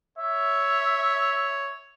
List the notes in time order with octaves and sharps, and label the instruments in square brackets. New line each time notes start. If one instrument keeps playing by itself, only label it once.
[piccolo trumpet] C#5 [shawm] E5